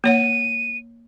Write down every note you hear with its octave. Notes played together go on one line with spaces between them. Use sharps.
A#3 C#5 F#5 D#7